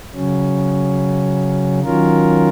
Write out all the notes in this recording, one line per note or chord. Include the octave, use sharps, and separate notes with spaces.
C#3 F#3 C#4
D#3 F#3 C#4 F4 A#4